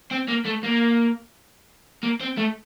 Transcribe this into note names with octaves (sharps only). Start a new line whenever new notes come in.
C4
A#3
A3
A#3
A#3
C4
A3